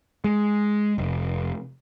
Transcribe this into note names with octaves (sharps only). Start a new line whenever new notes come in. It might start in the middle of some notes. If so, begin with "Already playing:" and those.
G#3
F1